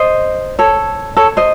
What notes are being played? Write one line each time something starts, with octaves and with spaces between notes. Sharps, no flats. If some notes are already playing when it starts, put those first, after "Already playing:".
Already playing: C5 D#5
A4 C#5
A4 C#5
C5 D#5